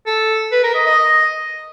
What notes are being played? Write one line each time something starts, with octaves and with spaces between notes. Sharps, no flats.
A4
B4
A#4
D#5
D#5